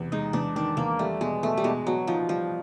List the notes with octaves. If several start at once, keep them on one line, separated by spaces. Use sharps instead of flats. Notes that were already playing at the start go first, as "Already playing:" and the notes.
Already playing: E2 C3
G#3 D#4
E2 D4
D#3 D4
E2 A#3
G3 A3
B2 G#3
B2 A3
G3
B2 G#3
B2 F#3
F3 D#4
F3 G3